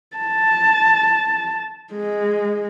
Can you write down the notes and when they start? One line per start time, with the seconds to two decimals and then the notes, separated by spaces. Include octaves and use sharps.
0.16 A5
1.93 G#3